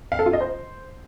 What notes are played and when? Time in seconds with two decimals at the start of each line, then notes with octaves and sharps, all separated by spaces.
0.12 F5
0.19 A4
0.26 F4
0.33 D#5
0.41 C5